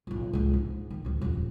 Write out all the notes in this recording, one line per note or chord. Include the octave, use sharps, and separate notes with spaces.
B1 F4
C#2 G2
G#2
D#3 F#3
D2 G#2
D#1 F2